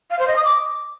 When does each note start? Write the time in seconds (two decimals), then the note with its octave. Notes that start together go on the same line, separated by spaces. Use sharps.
0.11 F5
0.19 C5
0.28 D#5
0.36 D#6
0.45 D6